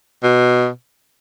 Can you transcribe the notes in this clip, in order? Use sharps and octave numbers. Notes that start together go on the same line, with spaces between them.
B2